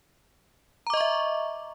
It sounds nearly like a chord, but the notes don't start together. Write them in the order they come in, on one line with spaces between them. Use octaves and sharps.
A#5 D6 D#5 C#6 E5